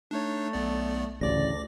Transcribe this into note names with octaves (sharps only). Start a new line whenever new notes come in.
A3 D4 D#4 C#5
B1 B3 D5
A1 D2 C#3 D5 D6 A#6